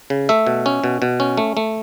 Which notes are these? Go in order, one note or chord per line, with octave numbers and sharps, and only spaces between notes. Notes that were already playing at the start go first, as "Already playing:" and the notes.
C#3
A3 E5
B2
C#4
B2
B2
C#4
A3
A3